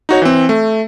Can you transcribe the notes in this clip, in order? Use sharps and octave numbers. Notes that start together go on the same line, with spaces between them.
D#4 F#4 C#5
E3 C4
A3